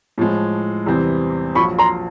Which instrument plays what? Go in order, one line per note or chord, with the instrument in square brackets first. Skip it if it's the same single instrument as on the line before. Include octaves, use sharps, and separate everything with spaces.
[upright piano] A2 F3 G#3
E2 C3 E3 G3 C4
[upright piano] A#1 A#2 F#3 [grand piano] B5 C#6
[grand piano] A#5 C6